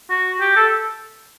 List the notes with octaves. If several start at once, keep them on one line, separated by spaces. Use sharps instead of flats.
F#4
G4
A4